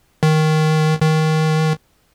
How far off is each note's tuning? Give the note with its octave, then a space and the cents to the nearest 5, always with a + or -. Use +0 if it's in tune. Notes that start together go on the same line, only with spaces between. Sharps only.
D#3 +5
D#3 +15